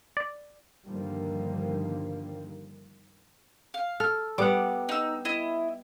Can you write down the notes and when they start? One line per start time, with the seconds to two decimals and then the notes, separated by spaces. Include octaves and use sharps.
0.17 D5
0.86 G2 D3 D#3 F3 G3 A#3
3.74 F5
4.00 A4 F6
4.38 G3 B3 F#5 D6
4.89 D#4 E6
5.25 E4 D#5